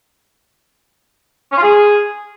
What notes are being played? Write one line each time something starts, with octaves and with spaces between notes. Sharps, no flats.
C#4
F4
G#4